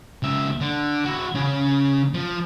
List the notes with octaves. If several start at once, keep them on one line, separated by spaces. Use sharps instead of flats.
C#2 E5
D3
E4 F#4
C#3 C#4
F3